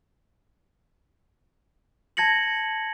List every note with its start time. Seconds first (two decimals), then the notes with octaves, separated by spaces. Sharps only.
2.17 A5 G#6 A#6 C#7 F#7